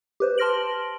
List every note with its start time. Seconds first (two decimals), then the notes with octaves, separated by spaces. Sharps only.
0.20 G4 B4 C5
0.38 A5 C6 F6 A#6 D7 F#7